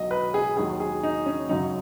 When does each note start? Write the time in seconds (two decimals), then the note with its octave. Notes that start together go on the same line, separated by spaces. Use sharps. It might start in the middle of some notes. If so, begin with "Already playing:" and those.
Already playing: B1 B2 F#3 D#5
0.11 B4
0.34 G#4
0.57 D#2 D#3 F#3 G#4
0.80 G#4
1.03 D#4
1.26 C#4
1.49 F#2 C#3 F#3 D#4